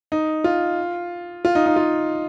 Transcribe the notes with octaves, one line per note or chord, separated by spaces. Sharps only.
D#4
F4
F4
D#4
D#4
F4